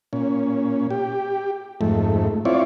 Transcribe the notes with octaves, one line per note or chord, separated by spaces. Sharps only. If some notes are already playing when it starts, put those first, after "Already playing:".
A#2 C#4
G4
F2 G#2 A3
C4 E4 F4 C#5 D5